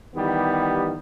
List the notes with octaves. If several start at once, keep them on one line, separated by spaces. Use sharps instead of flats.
D#3 E3 G3 B3 G4